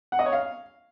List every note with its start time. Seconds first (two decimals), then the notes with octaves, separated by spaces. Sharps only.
0.12 F#5
0.19 D#5
0.26 C#5
0.33 F5